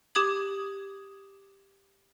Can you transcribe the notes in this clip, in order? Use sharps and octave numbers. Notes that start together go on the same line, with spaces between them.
G4 D6 D#6 G#6 F#7